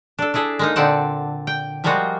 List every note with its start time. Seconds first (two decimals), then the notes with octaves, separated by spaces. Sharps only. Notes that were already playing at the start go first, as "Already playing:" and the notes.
0.19 D4 A4
0.34 D4 E4 G#4 A4
0.59 G#3 A#3 D#4
0.76 A#2 D3 C4 D5 F#5 A5
1.47 G5
1.84 F3 G3 G#3 A#3 F4 F#4